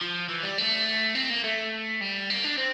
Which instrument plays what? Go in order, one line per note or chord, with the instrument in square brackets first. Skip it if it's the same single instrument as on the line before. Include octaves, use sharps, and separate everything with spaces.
[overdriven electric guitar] F3
E3
G3
A3
C4
A#3
A3
G3
A#3
D4
C4